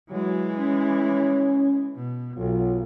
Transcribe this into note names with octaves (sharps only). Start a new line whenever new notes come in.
E3 F#3 G#3
C#4
B2
B1 F#3 F4 A4